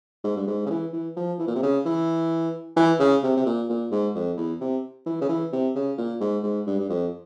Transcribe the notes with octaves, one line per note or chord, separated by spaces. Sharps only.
G#2
G2
G#2
C#3
E3
E3
F3
E3
A#2
C3
C#3
E3
E3
C#3
C3
C3
A#2
A#2
G#2
F2
E2
C3
E3
C#3
E3
C3
C#3
A#2
G#2
G#2
G2
G2
F2